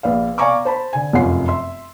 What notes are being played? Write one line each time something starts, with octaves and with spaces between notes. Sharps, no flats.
A#1 B4 D5 F5
D5 F5 G#5 A#5 C#6 D6
C5 A5 B5
D3 G#5
F1 F#2 C#4 F4 F#5 C7
E5 C6